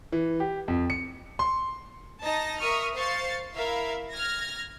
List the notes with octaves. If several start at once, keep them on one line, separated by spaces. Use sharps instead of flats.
E3
G4
F2
C#7
C6
D#4 A5 A#6
A#4 E5 C#6 D#6 F6
C5 F5 C#6 A6 C7
E4 A#4 E5 F5
F6 G#6 A#6